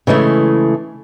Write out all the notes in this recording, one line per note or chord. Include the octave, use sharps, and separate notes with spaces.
C#3 E3 G#3 A3